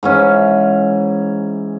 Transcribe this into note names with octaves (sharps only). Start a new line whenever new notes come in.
G#2 E3 C#4